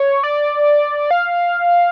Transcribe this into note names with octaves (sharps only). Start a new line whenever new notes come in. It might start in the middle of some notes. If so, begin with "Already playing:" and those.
Already playing: C#5
D5
F5